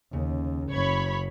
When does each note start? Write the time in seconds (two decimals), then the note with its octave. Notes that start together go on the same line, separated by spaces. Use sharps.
0.13 D#2 C#3
0.73 F#1 C#5 B5